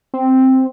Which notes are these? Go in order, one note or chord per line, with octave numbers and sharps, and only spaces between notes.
C4